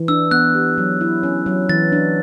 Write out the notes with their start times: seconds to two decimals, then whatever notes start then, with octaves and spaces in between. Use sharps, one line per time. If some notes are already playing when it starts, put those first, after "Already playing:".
Already playing: E3
0.08 D4 E6
0.31 B3 F#6
0.55 G4
0.78 F#3
1.01 E4
1.23 C#4
1.46 F#3
1.69 E3 A6
1.92 D4